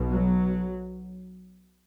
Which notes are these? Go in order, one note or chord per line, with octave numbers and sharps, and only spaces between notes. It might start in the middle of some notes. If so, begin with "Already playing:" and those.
Already playing: B1 B2
F#3